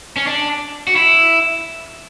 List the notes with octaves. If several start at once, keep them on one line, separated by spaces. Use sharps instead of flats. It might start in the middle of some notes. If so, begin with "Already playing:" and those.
C#4
D4
F#4
E4